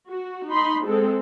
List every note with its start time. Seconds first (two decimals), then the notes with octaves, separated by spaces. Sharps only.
0.10 F#4
0.51 D#4 B5 C6
0.84 G#3 C4 A4